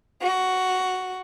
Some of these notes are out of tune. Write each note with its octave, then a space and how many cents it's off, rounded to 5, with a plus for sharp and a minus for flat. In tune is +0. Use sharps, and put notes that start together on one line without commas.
F#4 +5